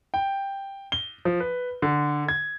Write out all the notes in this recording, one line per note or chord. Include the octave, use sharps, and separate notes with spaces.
G5
G7
F3
B4
D3
G#6